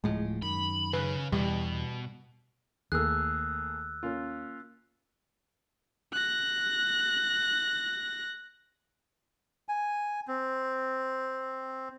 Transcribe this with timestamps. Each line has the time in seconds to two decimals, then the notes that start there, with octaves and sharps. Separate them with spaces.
0.04 D1 A2 F3 G#3
0.42 F#2 D#3 B5
0.93 C#3 B4
1.32 E2 B2 G3
2.92 D#2 A3 A#3 G#4 E6 F#6
4.03 A#3 C#4 F4
6.13 F#6 A#6
9.69 G#5
10.28 C4